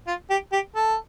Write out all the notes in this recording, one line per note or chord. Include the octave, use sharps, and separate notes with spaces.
F4
G4
G4
A4